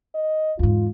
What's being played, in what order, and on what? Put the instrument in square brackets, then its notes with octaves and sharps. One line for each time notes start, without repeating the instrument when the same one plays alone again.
[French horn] D#5
[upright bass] E2 G#2 [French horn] F4